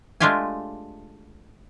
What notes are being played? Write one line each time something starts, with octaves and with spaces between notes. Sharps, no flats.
G#3 A3 D4 F4 G4 G#5